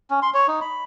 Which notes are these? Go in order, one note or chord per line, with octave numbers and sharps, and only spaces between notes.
C#4
C6
C#5
D#4
B5